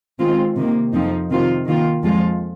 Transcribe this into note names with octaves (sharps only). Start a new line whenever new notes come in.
D#3 G#3 C4 F4
C3 D#3 A#3
F2 F3 C4 D#4
C3 D#3 C4 F4
D#3 A#3 F4
F2 F3 G#3 F4